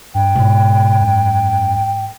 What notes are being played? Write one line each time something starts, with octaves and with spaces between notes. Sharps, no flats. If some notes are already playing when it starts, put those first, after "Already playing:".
G2 G5
G#2 B2
F#2